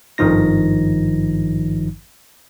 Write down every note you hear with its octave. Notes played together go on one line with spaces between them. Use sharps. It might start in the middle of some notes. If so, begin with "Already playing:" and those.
G#1 G2 D#3 F3 D#4 A#6